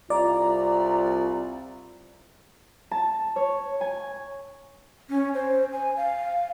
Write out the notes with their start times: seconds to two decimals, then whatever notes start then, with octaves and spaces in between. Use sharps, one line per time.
0.10 C2 F4 D5 A#5
2.91 A5
3.36 C#5
3.81 G#5
5.10 C#4
5.34 C5
5.72 G#5
5.97 F5